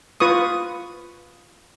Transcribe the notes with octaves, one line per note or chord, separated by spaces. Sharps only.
F4 B4 C#6 D#6